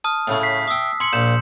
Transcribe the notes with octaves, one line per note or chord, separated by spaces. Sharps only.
A5 D#6 F6
A2 C#3 A3
B6 C7
E5 G5 D#6 E6
G#5 C6 C#7 F#7
A#1 A#2 G6 E7